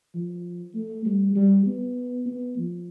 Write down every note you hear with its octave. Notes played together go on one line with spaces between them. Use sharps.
F3
A3
G3
G3
B3
B3
F3